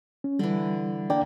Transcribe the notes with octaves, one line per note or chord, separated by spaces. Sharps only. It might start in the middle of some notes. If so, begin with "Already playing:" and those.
C#4
D3 E3 G3
A#3 D4 D5 G5